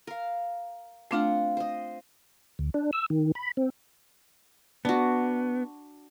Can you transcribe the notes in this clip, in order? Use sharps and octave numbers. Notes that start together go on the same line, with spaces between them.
A#4 F5
A3 C4 D4 F4 F#5 F6
C5 D#5
D2
D4
E6
D#3
B5
C4
B3 D4 F#4